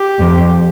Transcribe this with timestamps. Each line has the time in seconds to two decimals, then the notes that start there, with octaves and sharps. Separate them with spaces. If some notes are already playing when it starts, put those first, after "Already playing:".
Already playing: G4
0.18 F2